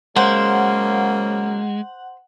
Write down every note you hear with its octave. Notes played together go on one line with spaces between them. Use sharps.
C#3 F#3 G#3 A#3 C5 F#5